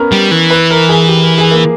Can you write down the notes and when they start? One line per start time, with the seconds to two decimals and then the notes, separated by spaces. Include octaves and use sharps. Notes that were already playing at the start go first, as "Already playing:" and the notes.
Already playing: B3 C#4 A#4
0.12 G3
0.31 E3
0.50 B4
0.71 A#4
0.89 G#4
1.08 G4
1.23 A#4
1.38 G#4
1.51 A#3